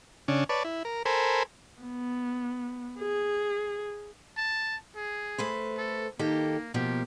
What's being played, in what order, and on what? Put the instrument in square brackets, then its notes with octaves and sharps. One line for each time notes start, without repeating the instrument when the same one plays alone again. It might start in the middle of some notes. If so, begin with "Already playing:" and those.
[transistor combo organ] C#3 C#4 D4
B4 C#5 D5 A5
E4
A#4
A4 A#4 C5 G#5 B5
[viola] B3
G#4
[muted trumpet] A5
G#4
[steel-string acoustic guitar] A3 B4 C5
[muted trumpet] A4
[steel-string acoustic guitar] D#3 G4 A4 [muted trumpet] A#3
[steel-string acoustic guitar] B2 F3 A#3 [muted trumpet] G4